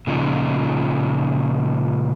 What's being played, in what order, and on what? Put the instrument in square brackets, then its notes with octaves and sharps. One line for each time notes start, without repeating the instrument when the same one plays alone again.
[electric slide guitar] A#2 C#3 F3 D#4